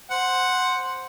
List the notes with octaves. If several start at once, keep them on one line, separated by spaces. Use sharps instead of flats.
C5 F#5